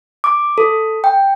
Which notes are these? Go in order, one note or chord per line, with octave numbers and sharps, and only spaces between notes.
D6
A4
G5